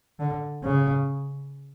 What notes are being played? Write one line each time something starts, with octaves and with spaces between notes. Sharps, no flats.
D3
C#3